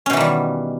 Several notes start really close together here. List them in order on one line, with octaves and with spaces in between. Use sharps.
C#4 B2 E3 D#3 G3